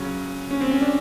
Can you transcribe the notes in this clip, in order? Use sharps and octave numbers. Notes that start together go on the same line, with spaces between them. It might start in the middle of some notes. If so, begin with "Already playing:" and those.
Already playing: C#3 F#3 C#4
C#4
C4
C#4
D4